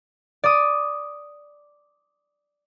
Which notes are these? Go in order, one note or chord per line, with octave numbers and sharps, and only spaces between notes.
D5 D#6